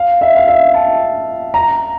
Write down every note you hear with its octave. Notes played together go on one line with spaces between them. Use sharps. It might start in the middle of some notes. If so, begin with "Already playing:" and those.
Already playing: F5
E5
F5
E5
A5
A#5